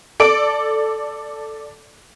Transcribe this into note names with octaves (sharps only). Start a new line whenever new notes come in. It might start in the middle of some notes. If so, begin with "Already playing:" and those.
A4 D5 D7